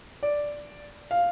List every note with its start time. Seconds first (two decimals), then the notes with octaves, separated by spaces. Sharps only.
0.23 D5
1.11 F5